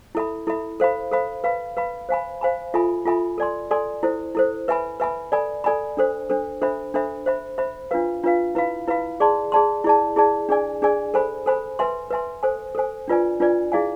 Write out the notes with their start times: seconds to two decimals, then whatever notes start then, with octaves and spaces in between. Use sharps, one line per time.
0.15 E4 A4 E5 B5
0.47 E4 A4 E5 B5
0.80 A4 C5 F5 B5
1.11 A4 C5 F5 B5
1.44 B4 F5 B5
1.77 B4 F5 B5
2.09 C5 F5 G#5 B5
2.41 C5 F5 G#5 B5
2.74 F4 A4 E5 G#5 B5
3.05 F4 A4 E5 G#5 B5
3.38 A4 D5 G#5 C6
3.71 A4 D5 G#5 C6
4.03 E4 A4 C5
4.35 E4 A4 C5
4.68 B4 E5 G#5 B5
5.00 B4 E5 G#5 B5
5.32 A4 D5 G#5 B5
5.64 A4 D5 G#5 B5
5.97 D4 A4 C5
6.30 D4 A4 C5
6.62 D4 A4 C5 E5 B5
6.94 D4 A4 C5 E5 B5
7.26 C5 E5 B5
7.58 C5 E5 B5
7.91 D4 F4 B4 F5
8.23 D4 F4 B4 F5
8.55 E4 B4 F5 B5
8.88 E4 B4 F5 B5
9.20 G#4 D5 A5 C6
9.52 G#4 D5 A5 C6
9.84 E4 G#4 D5 A5
10.16 E4 G#4 D5 A5
10.49 D4 G#4 D5 G#5
10.82 D4 G#4 D5 G#5
11.14 A4 C5 G#5 B5
11.46 A4 C5 G#5 B5
11.79 B4 E5 G#5 C6
12.11 B4 E5 G#5 C6
12.43 A4 C5 G#5
12.75 A4 C5 G#5
13.08 D4 F4 B4 D5 G#5
13.40 D4 F4 B4 D5 G#5
13.72 E4 G#4 D5 F5 G#5